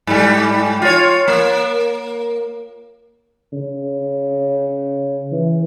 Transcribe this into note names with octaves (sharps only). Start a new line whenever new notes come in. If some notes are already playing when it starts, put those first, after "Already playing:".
G#2 G3
F4 C#5
A#3
C#3
E3